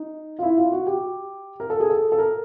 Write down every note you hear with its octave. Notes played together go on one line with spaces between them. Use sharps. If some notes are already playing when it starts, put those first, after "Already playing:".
Already playing: D#4
F4
E4
F4
F#4
G4
A#4
A4
G#4
A4
A4
A#4